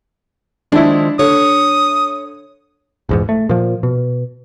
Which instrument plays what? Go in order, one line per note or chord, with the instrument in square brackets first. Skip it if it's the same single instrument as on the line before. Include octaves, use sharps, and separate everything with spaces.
[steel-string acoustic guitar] D#3 F3 G#3 [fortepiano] D4 E4
[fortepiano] D3 [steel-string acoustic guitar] C#5 [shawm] D#6
[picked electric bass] A#1 E2 G#2
A3
A#2 F3
B2